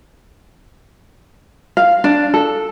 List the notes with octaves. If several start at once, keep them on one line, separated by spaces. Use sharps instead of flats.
F5
D4
A4